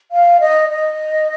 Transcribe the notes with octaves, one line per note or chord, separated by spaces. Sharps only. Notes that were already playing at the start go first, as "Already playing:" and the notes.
F5
D#5
D#5